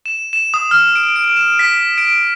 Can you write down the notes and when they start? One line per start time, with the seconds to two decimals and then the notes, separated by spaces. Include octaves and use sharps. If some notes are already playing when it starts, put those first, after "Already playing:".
0.06 E7
0.33 E7
0.54 D#6
0.71 F6
0.96 D7
1.16 D7
1.36 E7
1.59 B6
1.98 D7